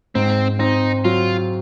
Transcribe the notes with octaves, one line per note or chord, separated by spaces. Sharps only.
G#2 C4
C4 D#4
F#3 F4